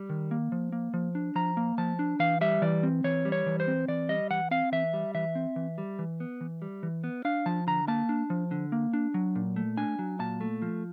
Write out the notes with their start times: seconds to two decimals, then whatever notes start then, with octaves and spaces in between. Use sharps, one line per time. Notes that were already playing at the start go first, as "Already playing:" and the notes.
Already playing: G3
0.10 D#3
0.31 A#3
0.52 F3
0.72 A#3
0.94 F3
1.15 D4
1.35 F3 A#5
1.57 A#3
1.78 F3 A5
1.99 D4
2.19 E3 F5
2.41 G3 E5
2.62 E3 D5
2.83 C4
3.04 E3 C#5
3.25 G3
3.32 C#5
3.46 E3
3.60 C5
3.67 C4
3.88 E3 D5
4.09 G3 D#5
4.30 E3 F#5
4.51 C4 F5
4.72 E3 E5
4.93 G3
5.15 E3 E5
5.35 C4
5.56 E3
5.78 G3
5.99 E3
6.20 B3
6.41 E3
6.62 G3
6.83 E3
7.04 B3
7.25 D4 F5
7.46 F3 A5
7.67 D3 A#5
7.88 A#3 A5
8.09 D4
8.30 F3
8.51 D3
8.72 A#3
8.93 D4
9.14 F#3
9.36 A#2
9.56 A3
9.77 D4 G#5
9.99 F#3
10.19 A#2 A5
10.41 A3
10.62 F3